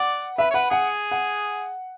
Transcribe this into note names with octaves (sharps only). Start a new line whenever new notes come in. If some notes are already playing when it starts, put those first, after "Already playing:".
Already playing: D5 F#5
B4 E5
C#5
B4 F#5
G#4 F#5
F#5